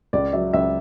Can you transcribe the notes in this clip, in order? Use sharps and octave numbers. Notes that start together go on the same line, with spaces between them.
C#2 D5
F#3 E5
C#2 E5